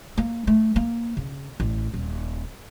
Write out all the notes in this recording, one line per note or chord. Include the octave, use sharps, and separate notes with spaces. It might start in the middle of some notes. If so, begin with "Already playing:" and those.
A#3
A3
A#3
C#3
A1
D#1